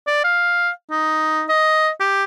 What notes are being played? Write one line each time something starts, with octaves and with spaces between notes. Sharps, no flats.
D5
F5
D#4
D#5
G4